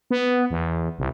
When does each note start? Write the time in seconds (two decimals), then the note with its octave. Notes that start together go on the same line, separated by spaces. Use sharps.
0.11 B3
0.50 E2
0.99 C2